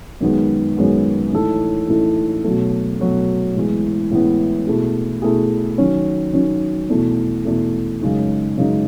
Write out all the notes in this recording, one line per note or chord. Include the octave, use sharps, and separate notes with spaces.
F#2 D#3 G#3 B3
F#2 D#3 G#3 B3
A2 E3 A3 D#4 A4
A2 E3 A3 D#4 A4
B2 F#3 A3
B2 F#3 A3
A2 E3 G#3 B3
A2 E3 G#3 B3
B2 A3 E4 G#4
B2 A3 E4 G#4
D#3 F#3 C#4
D#3 F#3 C#4
E2 B2 A3
E2 B2 A3
F#2 C#3 G#3 D#4
F#2 C#3 G#3 D#4